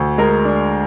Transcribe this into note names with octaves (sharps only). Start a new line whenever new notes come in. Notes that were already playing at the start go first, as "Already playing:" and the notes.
Already playing: D2
G#3 A#4
D4